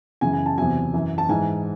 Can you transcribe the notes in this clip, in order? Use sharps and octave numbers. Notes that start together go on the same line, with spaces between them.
F#2 C#3 E3 G#5
G#5
A5
E2 C3 F#3 G#5
F#2 E3
A5
G#2 E3 G#5